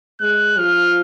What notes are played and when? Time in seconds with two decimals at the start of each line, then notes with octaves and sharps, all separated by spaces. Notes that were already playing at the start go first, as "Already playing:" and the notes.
0.21 G#3 F#6
0.58 F3 F6